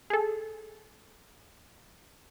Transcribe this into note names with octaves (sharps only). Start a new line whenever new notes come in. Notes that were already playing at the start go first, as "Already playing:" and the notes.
G#4 A4